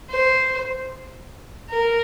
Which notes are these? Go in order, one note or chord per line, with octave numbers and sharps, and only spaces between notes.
C5
A#4